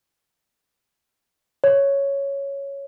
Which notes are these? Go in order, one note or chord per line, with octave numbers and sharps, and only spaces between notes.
C#5